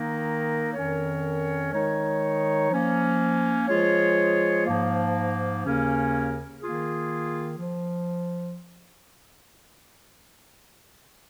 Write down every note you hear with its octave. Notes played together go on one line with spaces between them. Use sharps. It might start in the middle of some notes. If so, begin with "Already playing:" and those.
Already playing: D#3 A#3 D#4 A#4
F2 D#3 C#4 A#4 C#5
D#3 G#3 D#4 C#5
F3 A#3 C#4
F3 G#3 F4 G#4 C#5
G#2 F3 A#3
D#2 C#3 A#3 C#4 A#4
D#3 A#3 F4 G#4
F3